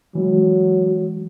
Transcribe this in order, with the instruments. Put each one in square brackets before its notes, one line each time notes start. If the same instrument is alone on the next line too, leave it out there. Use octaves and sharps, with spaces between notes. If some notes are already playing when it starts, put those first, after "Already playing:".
[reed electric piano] E3 G#3 [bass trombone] F#3